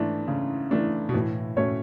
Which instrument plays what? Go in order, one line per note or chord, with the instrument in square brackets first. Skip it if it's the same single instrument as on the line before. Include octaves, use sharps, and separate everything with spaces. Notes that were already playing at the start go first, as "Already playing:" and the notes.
Already playing: [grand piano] G#2 [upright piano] E3 A3 D4
[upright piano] C#3
E3 A3 D4
[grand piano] B2
[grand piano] A2 [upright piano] E3
[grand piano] A2 [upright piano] A3 C#4 F#4 C#5